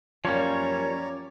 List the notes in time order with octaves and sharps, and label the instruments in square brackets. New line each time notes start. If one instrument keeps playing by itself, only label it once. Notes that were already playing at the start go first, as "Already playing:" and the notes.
[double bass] F#2 C#4 [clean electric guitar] F3 G3 A#3 [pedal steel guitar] C#5 [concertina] D5 A#5